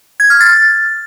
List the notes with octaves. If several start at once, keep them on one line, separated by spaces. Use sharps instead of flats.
G#6
F6
A6